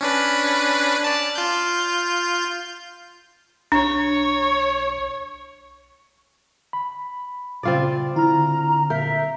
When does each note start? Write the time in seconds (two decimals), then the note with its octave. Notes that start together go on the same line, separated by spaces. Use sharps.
0.01 C#4 D4 B4
1.04 D5 A5
1.35 F4 G6
3.72 B1 D4 C#5
6.73 B5
7.63 A#2 C#3 C4 F4 D5
8.16 D3 E4 A#5 F6
8.90 A#2 A#4 E5 F5 G6